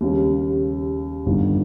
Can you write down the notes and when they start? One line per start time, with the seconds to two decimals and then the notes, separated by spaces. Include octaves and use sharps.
0.01 D#2 C#3 G3
1.26 G1 G2 D#3 A#3